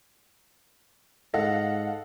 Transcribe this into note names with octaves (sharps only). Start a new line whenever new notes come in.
G#2 A4 D#5 F5 F#5